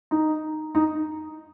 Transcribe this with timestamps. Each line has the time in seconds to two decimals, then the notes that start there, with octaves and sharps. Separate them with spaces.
0.11 D#4
0.75 D#4